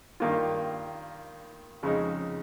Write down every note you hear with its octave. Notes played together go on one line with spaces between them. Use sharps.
G2 D#3 A#3 F4
F2 C#3 G#3 D#4